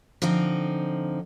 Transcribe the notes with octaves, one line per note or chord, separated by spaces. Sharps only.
D3 F3 C4 D#4